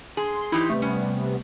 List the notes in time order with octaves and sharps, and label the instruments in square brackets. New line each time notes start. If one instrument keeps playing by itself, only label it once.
[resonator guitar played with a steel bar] G#4 [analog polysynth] C6
[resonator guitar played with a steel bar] E3 D#4 G4 [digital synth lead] E4
[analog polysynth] C3 G3 B3 [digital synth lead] A3
[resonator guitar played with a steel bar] C#4